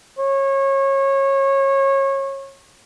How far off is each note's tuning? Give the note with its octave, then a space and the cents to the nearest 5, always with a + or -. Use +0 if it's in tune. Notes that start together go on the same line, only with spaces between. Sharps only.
C#5 -25